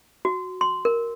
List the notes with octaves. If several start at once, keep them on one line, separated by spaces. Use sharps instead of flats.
F#4
C6
A#4